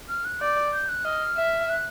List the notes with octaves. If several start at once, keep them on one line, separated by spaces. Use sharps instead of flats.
F6
F#6
D5 G6
G6
F#6
D#5 F6
E5
F#6